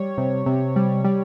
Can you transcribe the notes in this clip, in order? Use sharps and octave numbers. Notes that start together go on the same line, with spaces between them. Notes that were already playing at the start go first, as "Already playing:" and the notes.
Already playing: G3 C#5
C3
C3
G3
G3